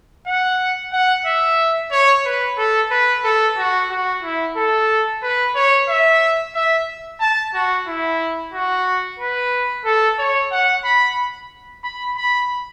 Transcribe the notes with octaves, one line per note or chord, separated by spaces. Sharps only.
F#5
F#5
E5
C#5
B4
A4
B4
A4
F#4
F#4
E4
A4
B4
C#5
E5
E5
A5
F#4
E4
F#4
B4
A4
C#5
F#5
B5
B5
B5